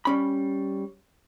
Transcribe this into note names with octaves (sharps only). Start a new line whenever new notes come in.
G3 C#4 B5